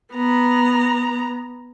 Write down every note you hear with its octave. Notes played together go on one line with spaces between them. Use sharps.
B3 A#5